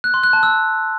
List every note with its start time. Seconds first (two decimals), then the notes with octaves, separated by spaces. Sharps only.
0.04 F#6
0.14 C6
0.24 F#6
0.33 A5
0.43 E6